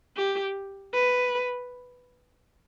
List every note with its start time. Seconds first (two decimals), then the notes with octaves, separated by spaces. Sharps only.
0.17 G4
0.94 B4